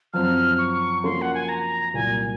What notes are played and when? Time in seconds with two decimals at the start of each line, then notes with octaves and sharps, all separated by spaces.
0.13 F#2 F3 C4 F6
0.58 C#6
1.04 F3 A#3 C#4 F#4 A#4 C6
1.22 F#5
1.34 G#5
1.49 A#5
1.94 C2 A#2 F#3 A#3 G#5